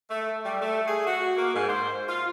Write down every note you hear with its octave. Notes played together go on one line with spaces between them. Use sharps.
A3
G3
A3
G#4
F#4
A#3
G#2
C5
F4